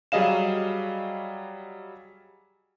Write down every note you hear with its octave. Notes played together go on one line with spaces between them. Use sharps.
F#3 G3 G#4 D#5 F5 E7